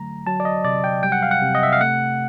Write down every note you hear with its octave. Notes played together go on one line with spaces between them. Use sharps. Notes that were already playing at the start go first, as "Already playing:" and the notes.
Already playing: D3 F#3 A3 A#5
F#3 A5
D5
D#5
C3 D5
G5
G3 G5
F#5
F5
F#5
C3
D#5
E5
F5
A3 F#5